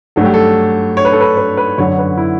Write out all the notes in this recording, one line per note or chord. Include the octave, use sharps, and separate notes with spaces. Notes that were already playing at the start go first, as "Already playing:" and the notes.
G2 F#3 A3 A4
G4
A4
C#5
B4
A4
B4
B4
B4
F#2 D3 F#3 C#5
B4
E4